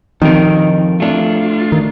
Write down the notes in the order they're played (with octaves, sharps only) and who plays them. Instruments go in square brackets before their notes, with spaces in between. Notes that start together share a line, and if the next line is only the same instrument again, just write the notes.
[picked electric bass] D#3 [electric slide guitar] F3 C4 F4 A#4
[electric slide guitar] A3 D4 F4
[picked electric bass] D#3